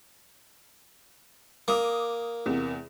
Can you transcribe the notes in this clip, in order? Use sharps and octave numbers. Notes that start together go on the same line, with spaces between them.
A#3 D6 D#6
E2 C3